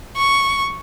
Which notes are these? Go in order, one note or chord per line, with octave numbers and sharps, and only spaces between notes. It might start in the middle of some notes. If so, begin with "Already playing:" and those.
C#6